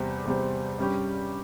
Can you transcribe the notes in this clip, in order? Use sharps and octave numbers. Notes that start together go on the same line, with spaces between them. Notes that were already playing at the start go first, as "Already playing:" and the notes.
Already playing: E2 C3 G3 C4 G4
E2 C3 G3 C4 G4
G2 G3 C#4 G4